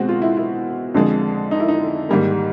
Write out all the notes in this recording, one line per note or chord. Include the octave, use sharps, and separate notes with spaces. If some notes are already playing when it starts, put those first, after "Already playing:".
Already playing: B2 G#3 C4 F#4
F4
E4
E4
F2 D3 F3 G#3
D#4
E4
D#4
G#2 D#3 G3 A#3